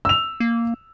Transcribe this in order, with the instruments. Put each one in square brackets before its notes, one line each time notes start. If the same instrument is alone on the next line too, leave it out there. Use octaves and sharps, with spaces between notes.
[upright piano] E6 F7
[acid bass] A#3